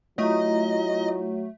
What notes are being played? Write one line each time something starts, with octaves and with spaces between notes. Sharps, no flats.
F#3 A3 E4 F4 D#5 A#5